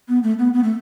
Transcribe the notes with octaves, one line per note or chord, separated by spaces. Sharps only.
B3
A3
B3
B3
A3